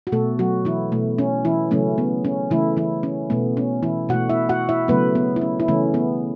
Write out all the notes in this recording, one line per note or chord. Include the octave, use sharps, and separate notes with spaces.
F#4
B2 A3 A4
F#3 F#4
E3 E4
B2 A3
C#4
E3 E4
C#3 F#3 A3 C#4
B3
C#4
C#3 E3 A3 E4
E3 E4
C#4
B2 A3 B3
C#4
E3 E4
B2 A3 F#4 F#5
E4 E5
F#4 F#5
E4 E5
C#3 F#3 A3 B3 B4
B3
E4
C#4
E4
C#3 E3 A3 C#4
B3